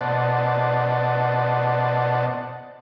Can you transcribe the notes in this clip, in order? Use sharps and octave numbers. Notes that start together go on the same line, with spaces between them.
B2 C5 D5 D#5 F#5 A5